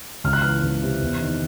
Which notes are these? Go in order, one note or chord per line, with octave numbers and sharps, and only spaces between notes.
C#2 F6
F#6
E3 F6
C#2
C3
E2
D#3